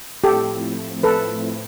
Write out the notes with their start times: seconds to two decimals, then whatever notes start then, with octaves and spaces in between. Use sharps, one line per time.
0.24 A2 F3 A3 C4 E4 G4 A4
1.03 A4 B4